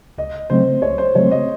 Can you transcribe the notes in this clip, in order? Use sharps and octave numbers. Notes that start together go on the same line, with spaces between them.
C#2 D#5
C#3 F#3 A3 C4 C5
C#2 C#5
C5
C#3 F#3 A3 C4 C#5
D#5